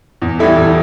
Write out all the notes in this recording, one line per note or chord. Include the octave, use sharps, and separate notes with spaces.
E2
E3 G3 E4 A4
E2